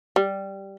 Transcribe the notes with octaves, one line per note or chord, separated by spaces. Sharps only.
G3